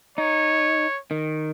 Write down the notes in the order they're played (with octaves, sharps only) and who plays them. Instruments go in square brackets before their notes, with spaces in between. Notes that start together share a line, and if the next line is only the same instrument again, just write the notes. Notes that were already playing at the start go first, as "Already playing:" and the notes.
[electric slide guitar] D#4 [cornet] C#5
[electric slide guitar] D#3